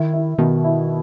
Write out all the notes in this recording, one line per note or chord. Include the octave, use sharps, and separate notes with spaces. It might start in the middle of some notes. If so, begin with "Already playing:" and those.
Already playing: D#3 E4
E4
B2 D#3
E4